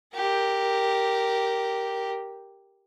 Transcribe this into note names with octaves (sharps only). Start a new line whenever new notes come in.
G4 A#4